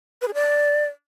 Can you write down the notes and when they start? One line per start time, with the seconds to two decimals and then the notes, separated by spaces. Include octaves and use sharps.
0.22 B4
0.28 G#4
0.34 D5